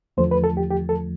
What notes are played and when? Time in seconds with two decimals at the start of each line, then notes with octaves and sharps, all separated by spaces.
0.17 E2 D3 F3 A3 C5
0.31 B4
0.44 A4
0.57 G4
0.70 G4
0.89 A4